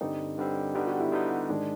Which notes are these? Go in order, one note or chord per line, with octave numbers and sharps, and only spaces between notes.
G2 D3 G3 C4 D#4
G2 D3 G3 C4
D3 G3 B3 D#4 G4
F#4
E4
D3 G3 B3 D#4
G#2 D#3 G#3 D4